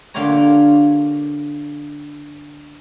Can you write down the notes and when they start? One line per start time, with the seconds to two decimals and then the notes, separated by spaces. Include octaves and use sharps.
0.14 D3 A#3 F4 G4 C#5 A#5